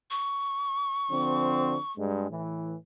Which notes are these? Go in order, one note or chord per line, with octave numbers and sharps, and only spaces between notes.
C#6
D3 F3 C4
G2 G#3
A2 E3